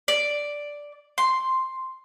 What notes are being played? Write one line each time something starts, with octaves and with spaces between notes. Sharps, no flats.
D5
C6